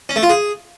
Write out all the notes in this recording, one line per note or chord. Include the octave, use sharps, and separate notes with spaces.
C#4
A3
F4
G#4